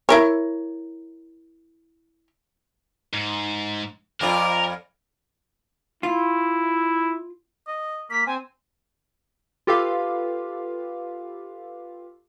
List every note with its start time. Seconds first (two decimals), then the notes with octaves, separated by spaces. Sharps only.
0.09 E4 A#4 C#5
3.13 G#2
4.21 F2 F4 A#4 D5
6.03 E4 F4
7.67 D#5
8.10 A#3 B6
8.26 C4 G#5
9.67 F4 G4 A4 B4 F5